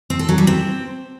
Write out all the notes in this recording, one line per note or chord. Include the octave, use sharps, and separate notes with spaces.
C4
A4
F#3
G3
C4